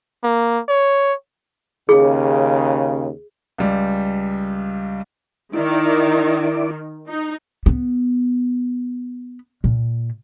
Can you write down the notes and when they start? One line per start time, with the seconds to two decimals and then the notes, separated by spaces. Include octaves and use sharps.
0.23 A#3
0.68 C#5
1.89 D#2 C#3 G#4
3.58 C#2 G3
5.53 D#3 E4 D5
7.07 D#4
7.66 B3
9.64 A#2